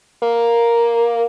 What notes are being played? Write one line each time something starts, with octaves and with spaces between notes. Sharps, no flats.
A#3